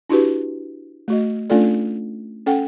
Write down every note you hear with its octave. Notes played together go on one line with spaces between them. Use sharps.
D4 E4 F#4 G4 B4
A3 F#4 D#5
A3 C#4 D4 F4 A4 D5
C#4 A4 F#5 G5